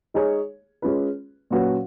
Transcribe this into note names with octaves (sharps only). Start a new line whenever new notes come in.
G#3 D#4 G#4 C#5
G#3 C#4 F4 B4
A#2 F#3 C#4 F#4 B4